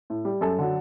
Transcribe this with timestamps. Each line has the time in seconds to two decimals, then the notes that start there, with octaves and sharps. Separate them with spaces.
0.10 A2
0.25 G3
0.41 F#2 A4
0.58 D3 F#3